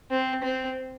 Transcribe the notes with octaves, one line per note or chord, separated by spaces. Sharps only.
C4
C4